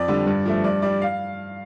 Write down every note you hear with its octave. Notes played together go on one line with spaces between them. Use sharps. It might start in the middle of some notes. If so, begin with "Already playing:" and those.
Already playing: F2 D5
D3 G3
G2
F3 A3
G2 D5
G3 D5
F5